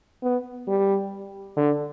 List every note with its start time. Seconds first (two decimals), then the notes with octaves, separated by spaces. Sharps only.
0.23 B3
0.68 G3
1.57 D3